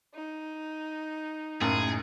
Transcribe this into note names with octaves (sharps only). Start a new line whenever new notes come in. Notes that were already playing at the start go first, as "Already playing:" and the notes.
D#4
F#1 A2 G#4